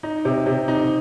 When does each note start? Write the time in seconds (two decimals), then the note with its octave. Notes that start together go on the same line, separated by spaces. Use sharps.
0.03 D#4
0.25 C3
0.46 C3
0.68 D#4